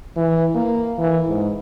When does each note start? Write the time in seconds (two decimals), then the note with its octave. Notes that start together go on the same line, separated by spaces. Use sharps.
0.17 E3
0.55 A#3
0.99 E3
1.29 G#2